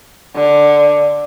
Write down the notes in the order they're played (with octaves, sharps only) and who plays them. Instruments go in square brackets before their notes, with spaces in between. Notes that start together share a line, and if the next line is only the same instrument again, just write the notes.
[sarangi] D3